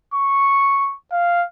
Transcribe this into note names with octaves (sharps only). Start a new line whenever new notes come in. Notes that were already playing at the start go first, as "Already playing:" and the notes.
C#6
F5